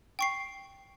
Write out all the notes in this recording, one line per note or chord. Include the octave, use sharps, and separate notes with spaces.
G5 C#6 C7